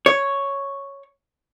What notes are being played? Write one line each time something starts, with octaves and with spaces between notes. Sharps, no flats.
C#5